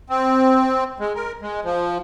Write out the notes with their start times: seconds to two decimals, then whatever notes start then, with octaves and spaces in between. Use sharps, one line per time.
0.10 C4
1.00 G#3
1.15 A#4
1.42 G#3
1.64 F3